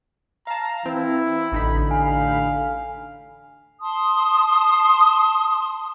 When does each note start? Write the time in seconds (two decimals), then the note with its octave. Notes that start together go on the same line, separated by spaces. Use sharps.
0.47 F5 A5 A#5
0.86 E3 C4 E4
1.52 A1 D3 D#4 B5
1.91 F5 G#5
3.81 A5 C6 D#6